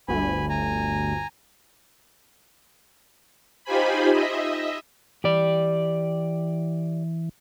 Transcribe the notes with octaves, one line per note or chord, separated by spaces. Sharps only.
G1 D2 G#5 B5
G#5 A#5
D#4 F4 G4 C5 G#5 B5
D#5 E5
E3 G4 D5